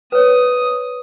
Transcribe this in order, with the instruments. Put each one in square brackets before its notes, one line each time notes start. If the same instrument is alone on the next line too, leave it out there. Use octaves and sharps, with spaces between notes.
[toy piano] B4 C#5 [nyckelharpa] D#6